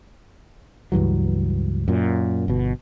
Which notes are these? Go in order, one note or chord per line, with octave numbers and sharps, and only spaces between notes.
C#2 G2 E3 F#3
F#2 A#2
G1 B2